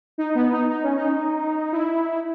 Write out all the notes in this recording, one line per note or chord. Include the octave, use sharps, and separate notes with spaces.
D#4
B3
D#4
D#4
C#4
D#4
E4